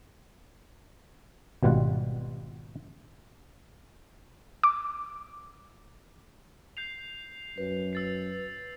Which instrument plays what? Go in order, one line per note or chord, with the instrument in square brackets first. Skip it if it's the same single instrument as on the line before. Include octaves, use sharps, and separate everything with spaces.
[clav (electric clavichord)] G#1 B2 G3 F4 F#5
[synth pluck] D6
[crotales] G6 C7 F7
[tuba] F#2 [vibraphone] B4
[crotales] E6 A6 C7